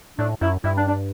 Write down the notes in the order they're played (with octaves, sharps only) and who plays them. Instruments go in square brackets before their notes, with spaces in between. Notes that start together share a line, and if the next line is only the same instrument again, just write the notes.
[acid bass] A2 [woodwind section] D4
[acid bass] F#2 [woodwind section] E4
[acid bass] G2 [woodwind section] E4
[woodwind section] D4
D4